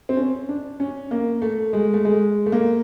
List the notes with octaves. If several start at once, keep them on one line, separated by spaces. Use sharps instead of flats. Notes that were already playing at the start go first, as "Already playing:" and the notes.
C4
C#4
D4
C#4
A#3
A3
G#3
A3
G#3
A3
A#3